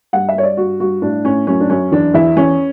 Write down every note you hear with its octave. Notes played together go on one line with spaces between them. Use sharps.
G2 F#5
E5
G2 C#5
D5
G2 F#4
G2 F#4
A2 D4
A2 C#4
F#2 C#4
D4
F#2 C#4
E2 D4
E2 E4
E2 C#4